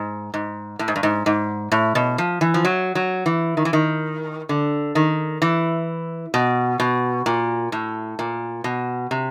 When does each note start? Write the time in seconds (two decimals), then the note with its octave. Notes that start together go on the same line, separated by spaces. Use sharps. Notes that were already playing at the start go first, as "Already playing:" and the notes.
Already playing: G#2
0.34 G#2
0.79 A2
0.88 G#2
0.96 G2
1.03 G#2
1.26 G#2
1.72 A2
1.95 B2
2.18 F3
2.41 E3
2.54 F3
2.65 F#3
2.95 F#3
3.26 E3
3.57 D#3
3.65 E3
3.73 D#3
4.49 D3
4.95 D#3
5.42 E3
6.34 B2
6.80 B2
7.26 A#2
7.72 A2
8.19 A#2
8.64 B2
9.11 C3